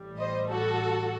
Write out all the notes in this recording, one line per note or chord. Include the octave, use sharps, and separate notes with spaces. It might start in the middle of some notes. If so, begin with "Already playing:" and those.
Already playing: A1 A2 G3
C5 D#5
F#4 A4